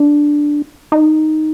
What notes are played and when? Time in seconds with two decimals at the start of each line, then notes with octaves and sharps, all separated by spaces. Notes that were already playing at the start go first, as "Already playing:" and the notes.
Already playing: D4
0.92 D#4